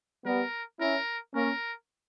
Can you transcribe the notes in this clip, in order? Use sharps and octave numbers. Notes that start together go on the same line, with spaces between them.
G3 B3 A#4
C#4 E4 A#4
A#3 C#4 A#4